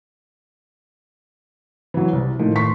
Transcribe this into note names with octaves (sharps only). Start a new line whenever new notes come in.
E3 F#3
C2
A2 D#3 F3
C6 C#6 B6